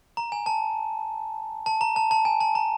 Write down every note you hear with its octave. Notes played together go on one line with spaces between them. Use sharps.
A#5
G#5
A5
A5
A#5
A5
A5
G#5
A5
A#5